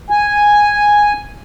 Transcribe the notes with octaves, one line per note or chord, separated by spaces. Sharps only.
G#5